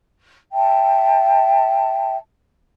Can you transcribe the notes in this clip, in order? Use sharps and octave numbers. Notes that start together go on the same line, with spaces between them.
E5 G5 A5